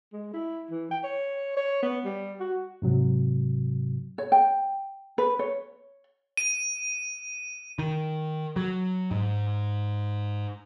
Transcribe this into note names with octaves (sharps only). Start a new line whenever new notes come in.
G#3
E4
E3
G5
C#5
C#5
B3
G3
F#4
G#2 C3 F#3
C#5
G5
B4
C#5
D#7
D#3
F#3
G#2